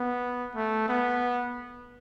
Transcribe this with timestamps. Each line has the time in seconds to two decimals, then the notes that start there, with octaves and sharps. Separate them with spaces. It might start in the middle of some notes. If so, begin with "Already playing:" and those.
Already playing: B3
0.55 A3
0.88 B3